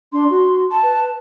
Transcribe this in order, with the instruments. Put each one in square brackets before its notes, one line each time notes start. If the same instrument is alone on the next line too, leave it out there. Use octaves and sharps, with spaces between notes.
[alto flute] D4 [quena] C6
[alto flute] F#4
[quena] A5
[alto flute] B4